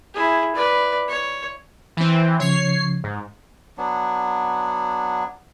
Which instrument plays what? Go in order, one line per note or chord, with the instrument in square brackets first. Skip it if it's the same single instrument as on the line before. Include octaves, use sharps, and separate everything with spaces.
[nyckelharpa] E4 G#4
B4 D5
C#5
[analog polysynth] E3 C4
[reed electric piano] C#3 F3 G#6 [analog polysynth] C#5 C7
[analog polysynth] G#2
[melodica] F#3 B3 D4